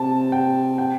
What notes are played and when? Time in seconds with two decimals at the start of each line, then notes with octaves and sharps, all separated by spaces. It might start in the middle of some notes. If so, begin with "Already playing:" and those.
Already playing: C3 A5
0.32 G5
0.78 G5